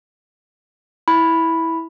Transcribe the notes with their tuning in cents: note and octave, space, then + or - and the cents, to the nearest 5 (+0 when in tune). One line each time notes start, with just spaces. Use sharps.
E4 -10 B5 +0